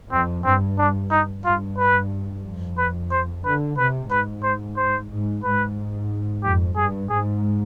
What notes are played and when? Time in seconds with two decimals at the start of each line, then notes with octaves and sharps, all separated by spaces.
0.12 F2 C4
0.45 G2 C4
0.78 D4
1.11 D#4
1.45 G2 F4
1.78 B4
2.44 F2
2.77 B4
3.11 C5
3.44 D3 B4
3.77 C3 B4
4.10 G#2 B4
4.43 C5
4.77 C5
5.10 G#2
5.43 G#2 B4
6.43 F2 G4
6.76 G2 G#4
7.09 G#2 G#4